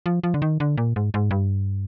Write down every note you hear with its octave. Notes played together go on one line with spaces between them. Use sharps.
F3
F3
D3
D#3
D3
A#2
G#2
G#2
G2